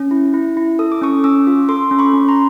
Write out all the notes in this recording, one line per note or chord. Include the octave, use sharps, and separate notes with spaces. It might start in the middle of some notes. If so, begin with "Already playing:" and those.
Already playing: C#4
E4
E4
E4
A4 D#6
D6
C#4 C#6 D#6
C#4 D6 E6
F4
A4 C6 D6
C#4
B5 C#6
C#4
A#5 C6